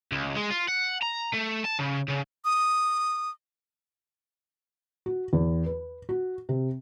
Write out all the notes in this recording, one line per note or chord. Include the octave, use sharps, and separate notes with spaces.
C#2
G#3
F4
F#5
A#5
A3
A5
C#3
C#3
D#6
F#4
E2
B4
F#4
C3